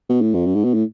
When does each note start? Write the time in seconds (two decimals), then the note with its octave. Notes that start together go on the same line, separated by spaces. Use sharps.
0.09 B2
0.21 A2
0.34 F2
0.46 F#2
0.55 G#2
0.64 B2
0.74 A2